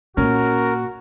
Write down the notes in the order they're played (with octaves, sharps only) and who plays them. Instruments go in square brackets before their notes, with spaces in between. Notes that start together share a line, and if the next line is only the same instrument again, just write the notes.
[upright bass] A#2 [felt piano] C#4 [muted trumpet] F#4 [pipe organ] A#4